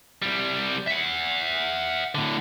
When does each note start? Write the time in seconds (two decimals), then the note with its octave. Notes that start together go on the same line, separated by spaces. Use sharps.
0.22 C2 G3
0.87 E5 F#5
2.15 A2 D3